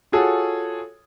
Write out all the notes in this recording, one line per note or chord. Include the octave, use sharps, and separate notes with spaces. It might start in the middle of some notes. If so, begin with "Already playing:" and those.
F4 F#4 G#4 A4 C#5